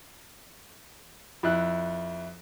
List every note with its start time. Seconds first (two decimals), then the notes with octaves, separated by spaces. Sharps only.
1.43 F2 E4 F#6